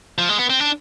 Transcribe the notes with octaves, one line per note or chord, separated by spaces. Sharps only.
F3
G#3
B3
C4
D4